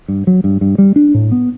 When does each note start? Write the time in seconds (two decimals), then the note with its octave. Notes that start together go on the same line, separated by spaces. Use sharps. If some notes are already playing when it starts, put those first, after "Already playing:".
0.08 G2
0.27 F#3
0.44 G2
0.61 G2
0.78 G3
0.96 D4
1.14 A2
1.32 B3